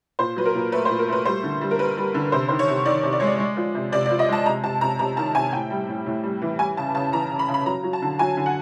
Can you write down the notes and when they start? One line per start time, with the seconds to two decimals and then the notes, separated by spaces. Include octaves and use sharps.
0.19 A#2 C5
0.36 F#3 B4
0.46 A#4
0.55 A#2
0.72 A3 B4
0.85 C5
0.90 A#2
0.99 A#4
1.08 A3 B4
1.25 G3 C5
1.43 D3
1.61 G3
1.71 A#4
1.79 G3 B4
1.97 G3
2.14 D3
2.32 C3 C5
2.48 D#3 C5
2.59 C#5
2.68 C3
2.86 D#3 D5
3.03 C3
3.13 D5
3.20 G#3 C#5
3.27 D5
3.39 G#3
3.57 F3
3.75 C3
3.92 C3 D5
4.06 D5
4.10 F3
4.19 D#5
4.28 G#3 A5
4.46 C3 A#5
4.64 C3 A5
4.81 C3 A#5
4.99 C3 A#5
5.17 D#3 A5
5.35 C3 G#5
5.53 A2 G5
5.70 G3
5.88 A2
6.06 A2
6.24 G3
6.42 E3
6.59 G3 G#5
6.77 C#3 A5
6.95 C#3 A5
7.13 E3 A#5
7.31 C#3
7.39 B5
7.48 C#3
7.54 B5
7.66 F#3 A#5
7.83 F#3
7.93 A5
8.02 D3
8.19 F#3 G#5
8.37 D3
8.46 F#5